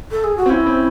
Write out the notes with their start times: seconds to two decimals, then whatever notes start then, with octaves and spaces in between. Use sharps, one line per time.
0.11 A4
0.24 G#4
0.37 F#4
0.46 C4
0.50 C#4 E4
0.66 C4